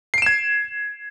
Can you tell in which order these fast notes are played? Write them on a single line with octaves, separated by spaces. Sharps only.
C7 D7 E7 G#6